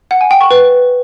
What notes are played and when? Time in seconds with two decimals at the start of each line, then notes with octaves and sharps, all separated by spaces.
0.11 F#5
0.21 G#5
0.31 G5
0.41 C#6
0.51 B4